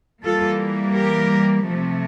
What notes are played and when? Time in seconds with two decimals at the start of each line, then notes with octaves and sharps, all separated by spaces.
0.23 E3 G3 A#3 F4 A4
0.95 G4 A#4
1.67 C3 F3 A3